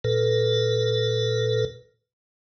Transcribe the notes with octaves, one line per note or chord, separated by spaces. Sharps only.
A#2 A4 B4